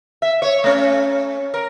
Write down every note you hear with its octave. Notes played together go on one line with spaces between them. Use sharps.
E5
C#5
A3 C#4
A#4